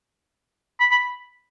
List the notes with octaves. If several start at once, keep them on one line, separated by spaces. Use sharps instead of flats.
B5
B5